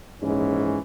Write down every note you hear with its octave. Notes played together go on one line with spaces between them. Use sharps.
A#1 G#2 E3 C#4